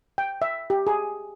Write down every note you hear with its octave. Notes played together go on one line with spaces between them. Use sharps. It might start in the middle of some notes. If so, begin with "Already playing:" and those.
G5
E5
G4
G#4